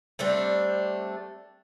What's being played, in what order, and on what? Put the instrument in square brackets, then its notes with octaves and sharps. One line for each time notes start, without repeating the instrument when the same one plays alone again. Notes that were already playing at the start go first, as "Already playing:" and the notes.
[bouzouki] G3 A3 C4 D4